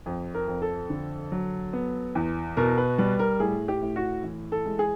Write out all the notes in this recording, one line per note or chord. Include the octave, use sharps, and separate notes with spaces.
F2
A#4
F2
A4
D3
F#3
B3
E2
B2 A#4
B4
G3 B4
A#4
A2 G#4
G4
A2
F#4
E3
A4
G#3
G#4